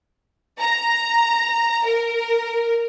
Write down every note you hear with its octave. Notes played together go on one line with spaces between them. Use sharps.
A#5
A#4